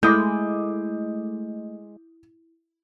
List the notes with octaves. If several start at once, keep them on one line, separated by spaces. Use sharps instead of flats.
G#3 A3 E4 D6 D#6 G6